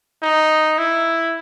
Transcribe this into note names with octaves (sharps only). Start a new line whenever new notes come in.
D#4
E4